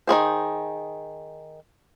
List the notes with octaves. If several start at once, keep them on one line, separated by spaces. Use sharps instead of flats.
D#3 C4 G#4 C5